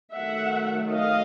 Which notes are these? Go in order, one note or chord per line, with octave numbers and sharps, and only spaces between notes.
D#3 F#3 A3 E5 F#5
D#5 F5